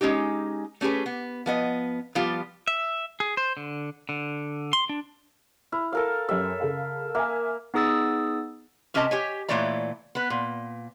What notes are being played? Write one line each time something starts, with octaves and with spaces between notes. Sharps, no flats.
G#3 C#4 D#4 G4
A3 C#4 G4 G#4 B4
B3
F3 B3 D#5
F3 G3 B3 F4 G4
E5
G#4
C5
D3
D3
C6
D4
E4 F6
A4 A#4 F5
F#2 G4 E5
C#3 A4 F5
A#3 E5 G#5
B3 D#4 G#4 D#6 E6 A6
C3 C#4 G4 A#4 D#5 A5
G4 C#5 G#5
A#2 E3 A3 C#5 D5 A#5
B3 B4
A#2